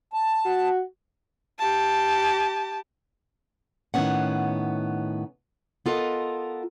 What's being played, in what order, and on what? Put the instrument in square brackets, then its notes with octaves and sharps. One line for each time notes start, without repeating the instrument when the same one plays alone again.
[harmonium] A5
[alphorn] F#4
[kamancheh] G4 A5
[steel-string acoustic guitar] A2 D#3 F3 B3 C#4 F#5
B3 F4 A4 A#4 D#5